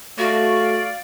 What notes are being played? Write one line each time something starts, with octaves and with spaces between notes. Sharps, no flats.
A3 F#4 D5 F5